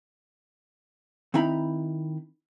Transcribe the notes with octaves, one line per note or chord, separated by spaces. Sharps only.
D#3 C4 D#4 E4 A#5 B5